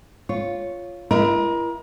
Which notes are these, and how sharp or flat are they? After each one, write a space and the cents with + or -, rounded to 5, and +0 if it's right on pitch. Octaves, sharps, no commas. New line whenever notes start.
F4 +0 C#5 +0
E4 +40 A#4 +35 D#5 +0